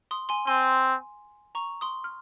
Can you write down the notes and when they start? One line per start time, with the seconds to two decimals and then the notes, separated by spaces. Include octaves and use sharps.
0.11 C6 D#6
0.29 G#5 C6
0.47 C4 G#5 C6
1.55 A#5 C#6
1.81 C6 D#6
2.04 F6